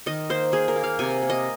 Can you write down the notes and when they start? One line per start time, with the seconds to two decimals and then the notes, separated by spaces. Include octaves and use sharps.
0.06 D#3 D#5
0.30 A#3 C5
0.52 A#3 G#4
0.68 A#4
0.76 A#3
0.83 F5
0.99 C3 G#5
1.22 A#3
1.30 D#5